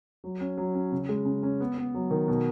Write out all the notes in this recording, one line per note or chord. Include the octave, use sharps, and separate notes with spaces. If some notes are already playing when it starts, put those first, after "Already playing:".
F#3
C#4
F#3
C#4
C#3
G#3
C#3
C#4
B3
B3
F#3
D#3
B2